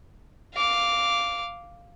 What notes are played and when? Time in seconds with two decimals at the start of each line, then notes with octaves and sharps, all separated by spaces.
0.54 F5 D6